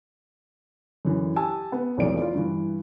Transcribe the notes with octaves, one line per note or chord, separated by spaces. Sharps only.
F#2 D3 E3
G4 G#5 A5 E6
B3
F1 B1 F2 E3 D5 D7
F4 D5
G2 E3